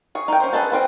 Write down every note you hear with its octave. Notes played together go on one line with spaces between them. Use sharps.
G#4 C#5
D#4 G5
C#4 C5
B3 G#4 A4 A5
B3 C4 D5 G5